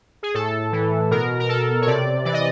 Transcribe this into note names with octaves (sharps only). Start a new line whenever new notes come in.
G#4
A2 A4
E3
B2 A#4
A#4
A4
C#5
C3 D5
E3 D5
D#5